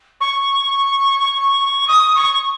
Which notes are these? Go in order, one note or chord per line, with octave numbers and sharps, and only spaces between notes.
C#6
D#6
C#6